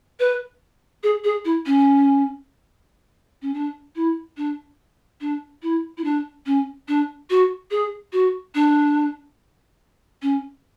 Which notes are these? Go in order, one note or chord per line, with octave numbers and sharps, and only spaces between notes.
B4
G#4
G#4
E4
C#4
C#4
D4
E4
D4
D4
E4
E4
D4
C#4
D4
F#4
G#4
F#4
D4
C#4